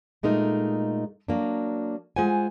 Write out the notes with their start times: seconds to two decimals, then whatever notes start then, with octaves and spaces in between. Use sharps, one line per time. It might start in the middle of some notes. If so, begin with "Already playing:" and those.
0.23 A#2 G#3 A3 D#4 A#4
1.28 F#3 A#3 D4
2.16 G#3 F4 C5 F#5 G#5